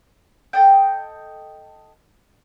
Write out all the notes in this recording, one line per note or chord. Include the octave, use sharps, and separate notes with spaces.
A4 D#5 G5